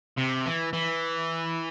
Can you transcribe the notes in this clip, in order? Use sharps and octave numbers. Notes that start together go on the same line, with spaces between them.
C3
E3
E3